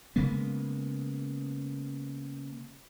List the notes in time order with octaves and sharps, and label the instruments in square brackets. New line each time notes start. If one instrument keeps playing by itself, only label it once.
[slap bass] C#3 G#3 A#3 B3